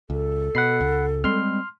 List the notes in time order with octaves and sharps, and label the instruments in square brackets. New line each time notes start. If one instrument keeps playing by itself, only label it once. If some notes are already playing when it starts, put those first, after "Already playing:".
[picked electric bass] C#2 [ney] A4
[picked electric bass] B2 [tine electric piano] F#5 B5 C7
[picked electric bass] C#2
[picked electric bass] G3 G#3 C4 [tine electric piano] C6 F6